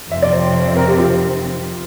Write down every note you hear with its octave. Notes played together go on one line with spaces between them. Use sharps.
F2 C3 F3 C4 E5
D5
C5
A#4
G4
F4